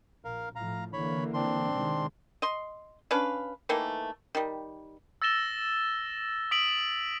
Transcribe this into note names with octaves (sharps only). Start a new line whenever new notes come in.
A#1 A#4 F5
A2 F3 F5 A#5
D3 E3 A#3 C#5 B5
C4 D4 C6
C3 D#3 G#3
D#5 C6
C#4 D4 B4 F5
D#3 E3 A3 A#3
D#3 G3
E6 A6 A#6 E7 G7
D#6 B6 D7 F#7